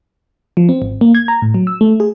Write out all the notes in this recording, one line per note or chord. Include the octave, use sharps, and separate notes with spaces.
F3
C4
G#1
A#3
G#6
A#5
A2
F#3
E6
A3
G#4